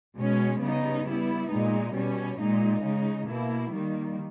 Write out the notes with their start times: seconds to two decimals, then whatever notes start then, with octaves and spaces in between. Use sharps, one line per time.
0.17 B2 G#3 C#4
0.61 C#3 G3 B3 D#4
1.06 G3 B3 E4
1.51 A#2 G#3 D#4
1.95 B2 G3 C#4
2.39 A#2 G#3 D#4
2.84 C#3 G#3 D#4
3.28 B2 A#3 E4
3.73 D#3 G3 A#3